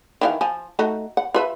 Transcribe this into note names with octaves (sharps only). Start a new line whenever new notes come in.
D#3 E3 F5
F3 G#5
A3 D#4 F#4
F#5
F4 B4 E5